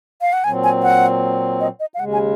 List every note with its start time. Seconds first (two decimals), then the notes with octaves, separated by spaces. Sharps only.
0.21 F5
0.33 F#5
0.44 A#2 F#3 C4 G#5
0.63 G#5
0.83 F#5
1.60 D#5
1.80 D#5
1.94 F5
1.99 D#2 C#3 G#3 F#5
2.13 G#5